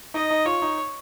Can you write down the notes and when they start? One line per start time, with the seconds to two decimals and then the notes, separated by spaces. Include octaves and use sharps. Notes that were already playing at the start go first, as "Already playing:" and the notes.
0.14 D#4 D#5
0.31 D#4
0.46 F4 C#5
0.62 D#4